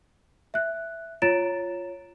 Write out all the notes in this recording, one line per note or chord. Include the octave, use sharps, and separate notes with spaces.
E5 F#6
F4 C#5 A#5 A6 D7 E7